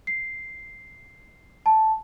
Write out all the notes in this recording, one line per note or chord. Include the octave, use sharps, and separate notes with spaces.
C7
A5